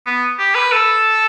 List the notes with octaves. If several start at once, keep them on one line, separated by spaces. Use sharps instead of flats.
B3
G4
B4
A4